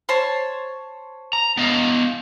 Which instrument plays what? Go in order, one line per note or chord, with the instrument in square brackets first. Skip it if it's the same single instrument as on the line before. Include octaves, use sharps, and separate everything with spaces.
[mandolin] C5 C#5 A5
[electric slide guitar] A#5
B3 D#5 F5